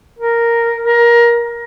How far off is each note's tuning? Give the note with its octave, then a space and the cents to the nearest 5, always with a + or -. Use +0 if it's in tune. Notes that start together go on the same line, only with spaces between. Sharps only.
A#4 +0
A#4 +20